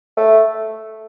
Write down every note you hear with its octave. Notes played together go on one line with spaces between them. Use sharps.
A3